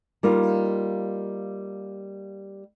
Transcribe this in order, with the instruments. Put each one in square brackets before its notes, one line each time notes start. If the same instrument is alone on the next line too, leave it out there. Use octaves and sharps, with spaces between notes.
[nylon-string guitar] G3 A#3 D#4 F4